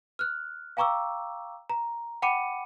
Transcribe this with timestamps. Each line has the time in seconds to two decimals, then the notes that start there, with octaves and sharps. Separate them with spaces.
0.19 F6 F#6
0.77 F5 G5 A#5 C#6 D6 E6
1.70 A#5
2.22 F#5 G5 B5 D6 C#7 D#7